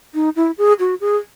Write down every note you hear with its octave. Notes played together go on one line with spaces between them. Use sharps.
D#4
E4
G#4
F#4
G#4